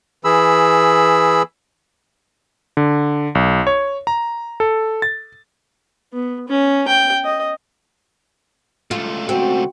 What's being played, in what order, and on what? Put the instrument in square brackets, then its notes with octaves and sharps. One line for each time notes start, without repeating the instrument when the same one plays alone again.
[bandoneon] E3 G#4 B5 E6
[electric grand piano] D3
B1
C#5
A#5
A4
A6
[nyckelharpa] B3
C#4
G5
D#5
[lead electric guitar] C#2 A3 [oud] F4
[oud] C4 [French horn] F#4